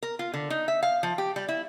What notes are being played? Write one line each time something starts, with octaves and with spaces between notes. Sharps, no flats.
A#4
F4
D3
D#4
E5
F5
F3
G4
G3
E4